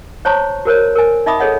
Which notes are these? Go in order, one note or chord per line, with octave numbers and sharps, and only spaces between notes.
C5 C#5 A5 A#5 C#6
F#4 A#4 C5 C#5
A#4 G#5
D#4 D#5 E5 B5 D6 D#6
G#4 A4 C#5 D#5 F#5